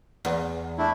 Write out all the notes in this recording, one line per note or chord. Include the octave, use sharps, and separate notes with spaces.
E2
A3 D4 E4